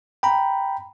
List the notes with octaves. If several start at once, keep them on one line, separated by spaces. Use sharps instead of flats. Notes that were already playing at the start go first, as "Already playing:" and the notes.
G5 A#5 B5